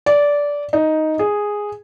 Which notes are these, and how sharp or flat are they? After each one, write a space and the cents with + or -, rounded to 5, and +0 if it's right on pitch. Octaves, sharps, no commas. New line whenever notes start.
D5 -15
D#4 +5
G#4 -5